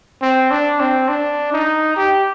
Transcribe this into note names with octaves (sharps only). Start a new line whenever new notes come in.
C4
D4
C4
D4
D#4
G4